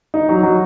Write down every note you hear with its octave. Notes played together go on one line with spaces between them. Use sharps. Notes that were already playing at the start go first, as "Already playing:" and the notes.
D#4
F#3
F#3